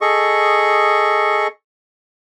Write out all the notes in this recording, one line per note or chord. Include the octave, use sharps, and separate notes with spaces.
G#4 A4 D#5 C#6